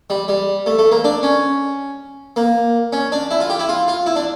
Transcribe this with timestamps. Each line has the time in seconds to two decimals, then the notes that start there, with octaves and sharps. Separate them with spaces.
0.10 G3
0.28 G3
0.66 A3
0.78 A3
0.92 A#3
1.04 D4
1.23 C#4
2.36 A#3
2.93 C#4
3.12 D4
3.31 E4
3.40 F4
3.50 G4
3.59 E4
3.69 F4
3.88 F4
4.06 E4
4.16 D4